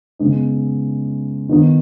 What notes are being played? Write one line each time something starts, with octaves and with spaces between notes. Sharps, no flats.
C#3 G#3 B3 D#4
D#3 B3 D#4